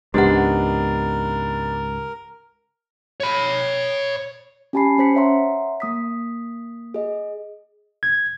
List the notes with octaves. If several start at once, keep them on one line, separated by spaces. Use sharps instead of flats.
C#2 G#2 G#3 B3 D4 G4 A#4 F#5
C#5 B5
C#4 G4 G#5 A5 B5 C7
C#4 C5 B6 C#7
C#5 E5 F#5 A#5 C6
A#3 D#6 B6
G#4 D#5
G#6